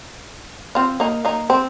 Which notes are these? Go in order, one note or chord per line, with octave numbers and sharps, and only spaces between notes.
C4 F4
A#3 D#4
A#3 D#4
C4